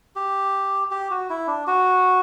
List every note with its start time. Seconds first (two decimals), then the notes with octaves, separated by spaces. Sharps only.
0.16 G4
0.91 G4
1.11 F#4
1.30 E4
1.47 D4
1.67 F#4